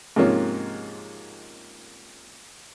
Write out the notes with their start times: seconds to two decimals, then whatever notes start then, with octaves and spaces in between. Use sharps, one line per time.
0.16 G#2 C3 F3 A#3 C#4